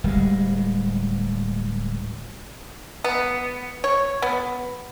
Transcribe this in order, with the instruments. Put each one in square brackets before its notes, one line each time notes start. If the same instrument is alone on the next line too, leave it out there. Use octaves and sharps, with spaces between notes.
[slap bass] D1 G3 G#3
[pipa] B3
C#5
B3